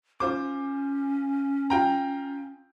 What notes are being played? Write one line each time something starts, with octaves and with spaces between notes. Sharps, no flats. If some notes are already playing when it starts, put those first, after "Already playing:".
C#4 F4 C5 D6
F4 G5 A#5